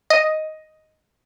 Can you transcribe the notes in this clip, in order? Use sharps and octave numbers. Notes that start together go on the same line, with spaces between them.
D#5